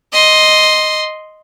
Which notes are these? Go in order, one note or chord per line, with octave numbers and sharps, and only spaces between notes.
D#5 C6